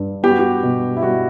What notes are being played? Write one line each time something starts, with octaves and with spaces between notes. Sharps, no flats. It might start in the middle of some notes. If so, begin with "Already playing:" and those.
Already playing: G2
B3 G4
F#4
G4
B2
E4
G3 F#4